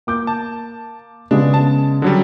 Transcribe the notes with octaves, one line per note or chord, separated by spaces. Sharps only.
A#3 D6 G6
A5
C#3 G#3 B3 D4
A5
D3 F#3 G3